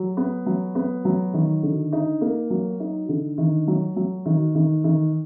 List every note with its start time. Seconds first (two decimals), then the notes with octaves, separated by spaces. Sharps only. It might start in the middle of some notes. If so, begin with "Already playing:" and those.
Already playing: F#3
0.17 B3
0.46 F#3
0.75 B3
1.05 F#3
1.34 D#3
1.63 D3
1.92 D#4
2.21 A#3
2.50 F#3
2.80 D#4
3.09 D3
3.38 D#3
3.68 F#3
3.96 F#3
4.26 D#3
4.55 D#3
4.84 D#3